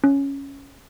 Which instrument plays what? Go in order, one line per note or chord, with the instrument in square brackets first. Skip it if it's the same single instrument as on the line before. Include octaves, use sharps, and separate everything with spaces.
[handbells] C#4